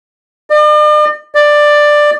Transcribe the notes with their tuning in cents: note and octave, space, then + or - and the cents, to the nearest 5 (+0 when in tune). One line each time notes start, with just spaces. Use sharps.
D5 +45
D5 +10